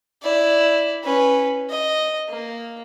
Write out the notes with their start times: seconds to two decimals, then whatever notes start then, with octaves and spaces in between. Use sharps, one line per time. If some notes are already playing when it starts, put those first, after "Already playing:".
0.23 E4 D5
1.04 C#4 B4
1.70 D#5
2.29 A#3